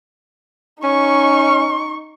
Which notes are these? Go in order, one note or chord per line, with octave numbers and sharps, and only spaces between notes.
C#4 D#4 C#6